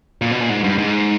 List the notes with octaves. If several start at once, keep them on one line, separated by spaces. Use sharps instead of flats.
A#2
B2
A#2
G#2
G2
G#2